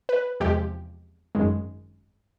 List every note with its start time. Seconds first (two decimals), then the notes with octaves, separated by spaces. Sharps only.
0.09 B4
0.40 E2 C3 F3 G#3 G4
1.35 G#1 F#2 D#3 G#3